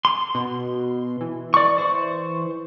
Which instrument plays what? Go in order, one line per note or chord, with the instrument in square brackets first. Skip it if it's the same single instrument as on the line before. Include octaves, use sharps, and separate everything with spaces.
[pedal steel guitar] C6
[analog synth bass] B2
E3
[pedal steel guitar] D5 C#6
C5 C#6